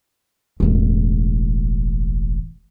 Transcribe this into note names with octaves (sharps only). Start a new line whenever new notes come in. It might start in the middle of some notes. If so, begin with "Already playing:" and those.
E1 A1